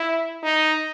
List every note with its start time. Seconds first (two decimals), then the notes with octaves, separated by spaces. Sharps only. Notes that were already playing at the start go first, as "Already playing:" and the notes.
Already playing: E4
0.43 D#4